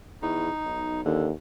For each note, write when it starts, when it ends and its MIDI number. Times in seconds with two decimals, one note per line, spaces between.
0.22 0.49 40
0.22 1.01 63
0.65 1.03 35
1.05 1.31 39
1.05 1.27 50